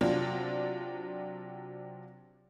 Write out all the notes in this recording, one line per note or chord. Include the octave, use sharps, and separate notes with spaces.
C3 F#3 D4 F4